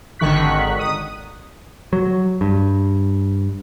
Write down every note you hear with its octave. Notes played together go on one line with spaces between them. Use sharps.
G#1 D3 D#3 C#6 F#6 B6
D#6
F#3
G2